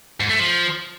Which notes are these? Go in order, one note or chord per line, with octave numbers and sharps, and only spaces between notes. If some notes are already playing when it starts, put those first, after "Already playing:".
G#2
A3
F3